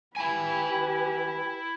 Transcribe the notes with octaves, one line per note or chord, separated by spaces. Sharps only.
E4 G4 B4 G#5 B5